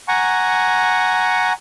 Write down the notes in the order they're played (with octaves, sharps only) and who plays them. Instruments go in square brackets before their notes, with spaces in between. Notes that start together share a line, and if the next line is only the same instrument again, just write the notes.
[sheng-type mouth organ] F#5 G#5 A#5 C#6